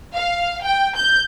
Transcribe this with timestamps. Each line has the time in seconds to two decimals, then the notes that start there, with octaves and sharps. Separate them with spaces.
0.15 F5
0.64 G5
0.96 G6